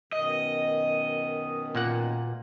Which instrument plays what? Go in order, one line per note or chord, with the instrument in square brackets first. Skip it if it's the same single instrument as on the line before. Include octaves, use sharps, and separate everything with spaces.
[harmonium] F#2 B2 D#3 [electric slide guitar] D#5
[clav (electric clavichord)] A#2 A#3 F#5